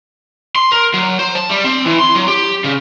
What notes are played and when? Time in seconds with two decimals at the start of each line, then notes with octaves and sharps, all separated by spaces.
0.56 C6
0.72 A#4
0.94 F#3
1.19 C5
1.35 A5
1.49 G3
1.65 C4
1.86 E3
1.99 C6
2.15 F#3
2.28 G4
2.64 C#3